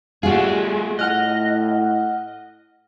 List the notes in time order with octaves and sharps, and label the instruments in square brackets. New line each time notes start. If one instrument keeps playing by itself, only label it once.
[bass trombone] G3 [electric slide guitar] A3 G#4 [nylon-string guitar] F4 F#4
[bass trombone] A2 [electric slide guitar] D#5 [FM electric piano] F#5 F6 F#6